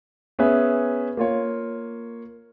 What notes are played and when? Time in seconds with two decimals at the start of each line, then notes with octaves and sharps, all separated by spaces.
0.39 B3 C#4 G#4 B4 E5
1.17 A#3 F4 C#5